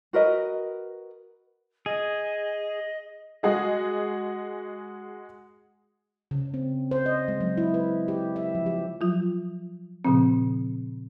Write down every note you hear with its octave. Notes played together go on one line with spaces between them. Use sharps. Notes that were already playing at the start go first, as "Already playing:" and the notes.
F#4 A#4 B4 D#5
G#4 D#5
G#3 F#4 G#4 D#5
C#3
C4
C5
D#5
G#3
F#3
E4
B4
G4
E5
F3
G4
F3 F#3 F4
A#2 C#3 F3 C4